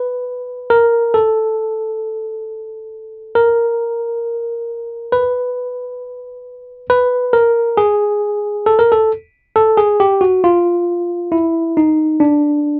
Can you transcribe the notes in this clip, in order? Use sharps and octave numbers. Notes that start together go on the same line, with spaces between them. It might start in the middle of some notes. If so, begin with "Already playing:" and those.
Already playing: B4
A#4
A4
A#4
B4
B4
A#4
G#4
A4
A#4
A4
A4
G#4
G4
F#4
F4
E4
D#4
D4